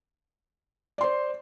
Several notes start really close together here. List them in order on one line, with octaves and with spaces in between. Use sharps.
D5 C6 C5